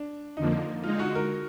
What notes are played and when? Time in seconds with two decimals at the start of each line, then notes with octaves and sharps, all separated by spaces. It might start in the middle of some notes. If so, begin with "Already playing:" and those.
Already playing: D4
0.37 F2 D3 F3 A#3 D#4
0.83 D3 G#3 D#4 F4
0.99 F#4
1.15 A#4